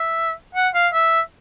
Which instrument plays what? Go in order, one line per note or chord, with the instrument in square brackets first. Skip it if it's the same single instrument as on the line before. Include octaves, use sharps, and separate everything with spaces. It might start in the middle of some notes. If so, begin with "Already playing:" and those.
Already playing: [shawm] E5
F#5
F5
E5